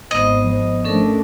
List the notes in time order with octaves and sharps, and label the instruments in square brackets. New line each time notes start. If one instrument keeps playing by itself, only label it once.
[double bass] G#1 [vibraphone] B3 C5 [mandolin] D#5
[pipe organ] F3
[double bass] A3 D4 [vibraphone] C#4 A4 A#4